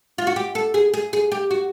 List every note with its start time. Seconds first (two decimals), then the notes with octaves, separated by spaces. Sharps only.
0.18 F4
0.27 F#4
0.36 G4
0.55 A4
0.74 G#4
0.94 G#4
1.13 G#4
1.32 G4
1.51 F#4